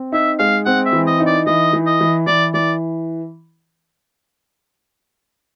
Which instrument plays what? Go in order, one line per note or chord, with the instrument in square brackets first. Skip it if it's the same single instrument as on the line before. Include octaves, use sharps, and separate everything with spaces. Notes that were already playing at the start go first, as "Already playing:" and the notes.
Already playing: [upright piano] C4
[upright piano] D#4 [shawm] E5
[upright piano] G#3 [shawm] F5
[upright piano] C4 [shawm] F#5
[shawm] E5
[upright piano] E3
[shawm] D#5
[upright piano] D#4
[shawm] D5
[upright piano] E3 [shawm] D#5
[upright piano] E3
[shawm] D#5
[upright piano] E3
[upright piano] E3 [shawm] D5
[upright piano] E3 [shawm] D5